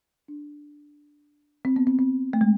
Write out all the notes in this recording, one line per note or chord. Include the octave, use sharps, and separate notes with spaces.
D4
C4
B3
C4
C4
A3
G#3